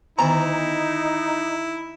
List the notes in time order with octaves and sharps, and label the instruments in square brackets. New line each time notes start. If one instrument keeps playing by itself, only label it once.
[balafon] D3 D#3 B3 [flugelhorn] D#4 [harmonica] E4 [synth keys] A#5